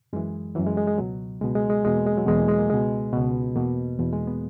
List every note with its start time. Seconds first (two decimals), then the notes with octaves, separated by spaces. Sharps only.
0.13 F#2 E3 G#3
0.55 F#2 E3 F#3
0.67 G#3
0.77 G#3
0.88 G#3
0.98 C#2 B2 F#3
1.41 C#2 B2 G#3
1.55 G#3
1.70 G#3
1.84 E2 B2 G#3
1.95 A#3
2.06 G#3
2.17 F#3
2.27 E2 B2 G#3
2.38 A#3
2.48 G#3
2.59 A#3
2.70 C#2 B2 G#3
3.13 C#2 B2
3.55 E2 B2 A#3
3.99 E2 B2
4.13 G#3
4.27 B3